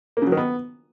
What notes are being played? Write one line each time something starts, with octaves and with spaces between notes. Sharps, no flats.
A#3
C#3
F#3
D#3
B3